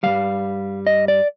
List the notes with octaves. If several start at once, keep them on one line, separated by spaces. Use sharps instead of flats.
G2 D#3 G3 F5
D#5
D5